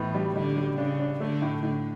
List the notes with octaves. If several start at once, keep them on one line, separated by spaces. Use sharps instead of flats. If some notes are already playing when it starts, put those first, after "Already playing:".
Already playing: A2 E3 B3
G3
D3 G3
G3
C#3 D4
D4
D3 A3
A2
A2 D3